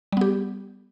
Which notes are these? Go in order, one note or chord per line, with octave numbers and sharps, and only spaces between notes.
G3 B3 G4